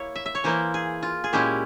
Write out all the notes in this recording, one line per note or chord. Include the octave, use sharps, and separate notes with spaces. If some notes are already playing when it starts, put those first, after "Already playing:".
Already playing: A#3 E4 C#5
E5
E5
C#5
E3 A#3 E4 C5
G#4
F4
G#4
A#2 G#3 C#4 E4 G4